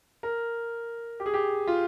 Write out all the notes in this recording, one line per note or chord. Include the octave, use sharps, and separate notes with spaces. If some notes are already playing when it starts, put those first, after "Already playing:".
A#4
G4
G#4
G4
F4